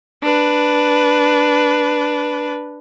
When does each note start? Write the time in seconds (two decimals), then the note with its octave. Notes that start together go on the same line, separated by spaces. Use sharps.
0.23 D4 B4